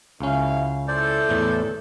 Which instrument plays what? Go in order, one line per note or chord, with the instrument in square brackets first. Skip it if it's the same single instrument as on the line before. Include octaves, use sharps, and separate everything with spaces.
[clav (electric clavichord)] C#2 C#4 [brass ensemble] F#2 E4 F5
[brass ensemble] E4 A4 [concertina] C5 D5
[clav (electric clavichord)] E2 A2 E3